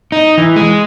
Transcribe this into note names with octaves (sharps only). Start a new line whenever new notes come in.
D#4
E3
G#3